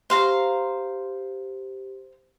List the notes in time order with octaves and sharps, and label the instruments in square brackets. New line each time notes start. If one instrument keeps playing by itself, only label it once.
[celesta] G4 [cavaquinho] C5 F5 A#5